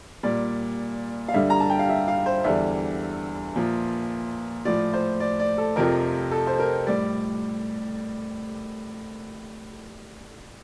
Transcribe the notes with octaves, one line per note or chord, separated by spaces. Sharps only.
A#2 G3 D5
F5
G2 D3 G3 E5
A#5
A5
G5
F5
E5
F5
C5
E2 D3 G3 E5
A#2 F3
A2 F3 D5
C5
D5
D5
A4
F2 C3 F3 A#4
A4
C5
A#4
A2 G3 D5